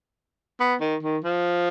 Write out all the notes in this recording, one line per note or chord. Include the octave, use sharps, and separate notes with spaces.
B3
D#3
D#3
F3